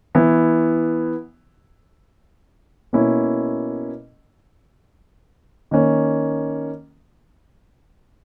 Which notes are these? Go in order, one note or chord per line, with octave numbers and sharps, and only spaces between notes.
E3 B3 E4
B2 A#3 C#4 E4
D#3 A#3 C#4